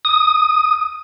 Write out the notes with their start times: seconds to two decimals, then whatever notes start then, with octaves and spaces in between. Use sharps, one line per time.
0.05 D#6